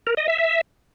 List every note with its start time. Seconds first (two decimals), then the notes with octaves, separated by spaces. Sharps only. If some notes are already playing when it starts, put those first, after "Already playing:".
0.07 A#4
0.17 D#5
0.28 E5
0.38 E5